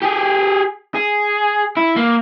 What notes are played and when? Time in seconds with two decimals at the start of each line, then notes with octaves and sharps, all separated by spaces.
0.02 G4 G#4
0.94 G#4
1.77 E4
1.96 A#3